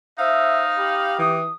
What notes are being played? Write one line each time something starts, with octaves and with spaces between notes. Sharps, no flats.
D#4 C5 E5 F5
G4 B5
E3 D#6